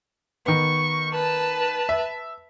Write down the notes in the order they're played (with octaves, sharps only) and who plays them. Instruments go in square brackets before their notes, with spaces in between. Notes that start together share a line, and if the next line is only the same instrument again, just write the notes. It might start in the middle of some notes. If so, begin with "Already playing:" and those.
[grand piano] D#3 B3 [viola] C#6
[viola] B4 A5
[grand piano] E5